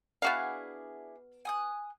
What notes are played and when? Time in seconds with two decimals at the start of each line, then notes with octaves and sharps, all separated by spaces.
0.22 B3 D4 E4 F#4 G#4 F5
1.45 G#5 D#6 F#6